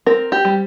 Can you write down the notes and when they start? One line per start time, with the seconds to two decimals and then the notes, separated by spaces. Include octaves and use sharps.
0.06 C4 A#4
0.32 G4
0.45 G3